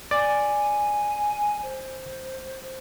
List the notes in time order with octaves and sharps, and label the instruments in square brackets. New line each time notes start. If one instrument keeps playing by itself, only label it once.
[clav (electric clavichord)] D5 [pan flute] G#5
[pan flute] C5